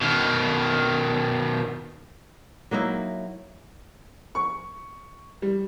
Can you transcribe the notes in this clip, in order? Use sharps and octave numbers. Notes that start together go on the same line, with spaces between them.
B2 D#3
F#3 A#3 D#4 E4
C#6
G3